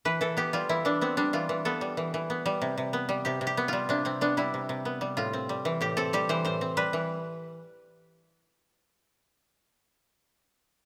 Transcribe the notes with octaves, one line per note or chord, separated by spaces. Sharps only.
E3 B4
E3 A4
B3 G4
G3 F4
E3 E4
E3 D4
B3 C4
G3 D4
E3 F4
E3
B3 A4
G3
E3
E3
B3
G3
C3
C3
B3
G3
C3 G4
C3
G4
B3
G3 F4
C3 D4
C3 C4
B3 D4
G3 E4
C3
C3
B3
G3
A2 F4
C4
G3
E3
A2 G4
C4 A4
G3 G4
E3 C5
A2 C5
C4
G3 B4
E3